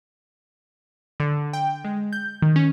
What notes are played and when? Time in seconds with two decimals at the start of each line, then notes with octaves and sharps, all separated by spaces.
1.20 D3
1.53 G5
1.84 G#3
2.13 G6
2.42 D#3
2.56 C#4